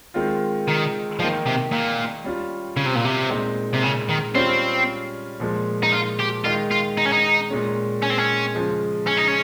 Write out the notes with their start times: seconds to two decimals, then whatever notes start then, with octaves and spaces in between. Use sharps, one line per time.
0.14 D#3 G#3 C4 F4
0.68 D#3
1.19 D#3 F3 A#3 D#4
1.46 C3
1.72 A#2
2.24 G3 C#4 F4
2.77 C#3
2.86 C3
2.95 A#2
3.05 C3
3.30 A#2 G#3 C4 D#4
3.73 C3
3.83 C#3
4.09 D#3
4.34 G3 C4 C#4 F4
5.40 A#2 F3 G#3
5.83 D#4
5.92 F4
6.19 G4
6.44 D#3 G#3 D#4 F4
6.71 F4
6.97 D#4
7.06 C#4
7.12 D#4
7.50 A#2 G#3 C#4
8.03 C#4
8.11 C4
8.18 C#4
8.55 C#3 F3 G#3
9.07 C#4
9.17 D#4
9.28 C#4